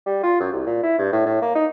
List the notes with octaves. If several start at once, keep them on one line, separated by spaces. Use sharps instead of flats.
G3
F4
F#2
C2
A#2
E4
G2
A2
A2
A#3
D#4